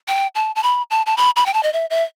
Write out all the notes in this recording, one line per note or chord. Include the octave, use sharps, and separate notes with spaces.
G5
A5
A5
B5
A5
A5
B5
B5
G5
A5
D#5
E5
E5